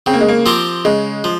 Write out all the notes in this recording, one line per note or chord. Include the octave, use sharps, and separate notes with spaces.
C#3 C4
A#3
G#3
A#3
F3 C4 G4 A#4
C#3 G#3
F3